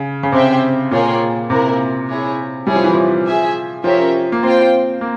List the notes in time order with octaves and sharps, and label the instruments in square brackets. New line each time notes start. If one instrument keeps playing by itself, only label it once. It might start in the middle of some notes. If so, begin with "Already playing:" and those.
Already playing: [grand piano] C#3
C#3
[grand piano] C3 [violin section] C4 G4 C5 E5 G5
[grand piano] A#2 [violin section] A#3 F4 G#4 C#5 G5
[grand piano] C3 [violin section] A#3 E4 A#4
[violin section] E4 G#4 C#5
[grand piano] G3 [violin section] E4 G#4 C#5
[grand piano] F3
E3
F3
[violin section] G#4 E5 G#5
[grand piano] F3 [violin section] C#4 G4 A#4 C#5 E5
[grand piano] A#3
[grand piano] C4 [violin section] F4 C5 G5
[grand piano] A#3